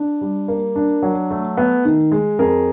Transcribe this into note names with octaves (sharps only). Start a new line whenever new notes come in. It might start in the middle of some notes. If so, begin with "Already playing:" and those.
Already playing: D4
G3
A#3
D4
F#3
A3
B3
D#3
G#3
F2 G#4 A#4